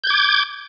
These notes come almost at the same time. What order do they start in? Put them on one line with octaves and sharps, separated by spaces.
G6 G#6 D6